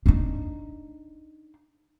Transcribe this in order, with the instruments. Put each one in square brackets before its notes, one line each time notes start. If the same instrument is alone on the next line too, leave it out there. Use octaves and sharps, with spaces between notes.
[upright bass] D4 D#4